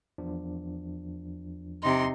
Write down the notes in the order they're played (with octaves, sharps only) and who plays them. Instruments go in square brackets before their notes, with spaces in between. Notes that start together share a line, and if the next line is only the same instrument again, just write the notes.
[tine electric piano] E2 F3 D4
[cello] C3 D#4 [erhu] C6